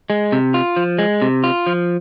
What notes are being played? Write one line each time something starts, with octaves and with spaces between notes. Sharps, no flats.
G#3
C3
F4
F3
G#3
C3
F4
F3